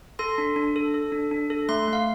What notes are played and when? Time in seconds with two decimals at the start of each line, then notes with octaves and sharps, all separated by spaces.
0.19 A4 C6
0.38 D4
0.56 D4
0.76 A4
0.94 A4
1.12 D4
1.31 D4
1.50 A4
1.69 A3 C6
1.87 A3
1.93 F5